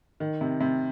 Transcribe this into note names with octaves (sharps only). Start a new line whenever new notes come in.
D#3
C3
C3